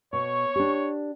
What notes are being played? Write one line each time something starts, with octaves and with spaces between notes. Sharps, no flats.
B2 C#5 C#6
D4 G4